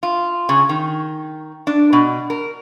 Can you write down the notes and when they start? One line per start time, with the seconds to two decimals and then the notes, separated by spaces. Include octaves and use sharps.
0.03 F4
0.49 C#3
0.69 D#3
1.67 D4
1.93 B2
2.30 A#4